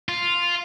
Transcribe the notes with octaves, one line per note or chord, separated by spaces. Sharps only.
F4